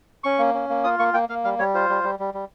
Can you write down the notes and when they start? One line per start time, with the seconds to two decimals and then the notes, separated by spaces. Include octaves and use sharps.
0.24 C#4 C#6
0.39 A#3
0.54 C#4
0.69 A#3
0.84 F4 D#6
0.99 A#3 C#6
1.14 A#3 G5
1.29 A#3 F5
1.44 G3 F5
1.59 G3 C#5
1.74 F4 C5
1.89 G3
2.04 G3
2.19 G3
2.34 G3